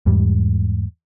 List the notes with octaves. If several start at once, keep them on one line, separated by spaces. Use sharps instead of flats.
E2 G#2 G3